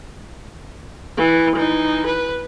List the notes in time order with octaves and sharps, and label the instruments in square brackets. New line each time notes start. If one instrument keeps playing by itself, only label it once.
[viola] E3
E3 D#4
B4